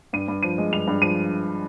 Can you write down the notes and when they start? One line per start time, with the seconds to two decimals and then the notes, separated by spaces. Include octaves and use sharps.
0.13 G2 D#7
0.28 G2
0.43 F3 D#7
0.58 G#3
0.73 G2 F7
0.87 G2
1.02 F3 D#7